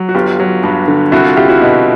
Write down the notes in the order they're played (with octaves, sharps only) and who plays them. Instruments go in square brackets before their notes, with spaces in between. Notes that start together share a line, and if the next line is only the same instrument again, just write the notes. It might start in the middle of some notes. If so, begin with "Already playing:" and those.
Already playing: [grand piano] F#3
F#4
G1 F4 G4
F#3
G2
D3
C2 E4 F#4
F4
C2 F4 G4
E4 F#4
B2